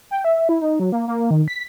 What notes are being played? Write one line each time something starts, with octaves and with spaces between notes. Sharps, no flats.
G5
E5
E4
D#4
F#3
A#3
A#3
D#3
B6